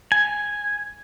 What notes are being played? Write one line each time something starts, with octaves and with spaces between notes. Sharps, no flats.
G#5